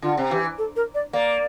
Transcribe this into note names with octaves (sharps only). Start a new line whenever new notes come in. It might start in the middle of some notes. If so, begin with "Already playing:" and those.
D3 F4
C3
E3 G4
A4
A#4
D5
A#3 D5